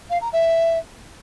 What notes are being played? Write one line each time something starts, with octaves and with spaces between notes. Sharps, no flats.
F5
A#5
E5